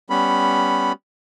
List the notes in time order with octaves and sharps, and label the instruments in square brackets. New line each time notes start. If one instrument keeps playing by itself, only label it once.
[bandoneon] G3 B3 C#4 B5